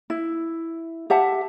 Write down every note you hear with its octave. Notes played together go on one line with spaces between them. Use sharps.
E4
G4 E5 F#5 A5